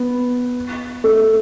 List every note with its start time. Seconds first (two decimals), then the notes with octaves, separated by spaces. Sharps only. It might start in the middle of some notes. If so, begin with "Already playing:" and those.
Already playing: B3
1.04 A3